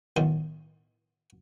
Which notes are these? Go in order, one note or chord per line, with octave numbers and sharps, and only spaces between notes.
B1 A2 D#3